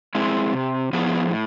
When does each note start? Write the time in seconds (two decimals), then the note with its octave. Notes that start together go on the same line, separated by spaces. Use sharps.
0.15 G#3 C4 E4
0.53 C3
0.93 F3 B3 E4 G#4
1.31 A2